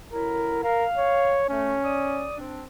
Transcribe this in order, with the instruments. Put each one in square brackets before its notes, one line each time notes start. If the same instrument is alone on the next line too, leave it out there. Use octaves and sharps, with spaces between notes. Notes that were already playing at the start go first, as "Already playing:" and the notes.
[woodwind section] F#2 D3 E4 [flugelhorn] A#4
[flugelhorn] A#4 [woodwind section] F5
[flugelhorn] C#5
[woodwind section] A3 [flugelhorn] C#4
[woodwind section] D5 D#6
C4 D4